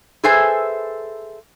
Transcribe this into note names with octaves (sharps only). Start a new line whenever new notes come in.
G#4 A4 B4 C5 E5 G#5